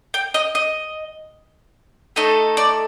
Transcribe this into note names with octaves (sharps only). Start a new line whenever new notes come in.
G5
D#5
D#5
A3 D#4 A4 D#5
D5